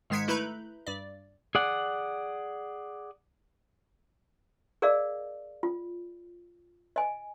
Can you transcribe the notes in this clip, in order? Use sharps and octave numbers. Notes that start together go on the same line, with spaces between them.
G#2 D#3 G#3 G#6 B6 C#7
A3 E4 B4 A#5 B5 G6
G2 D5
G#4 D5 F#5
G#4 A#4 D5 D#5 F5
F4
D#5 G#5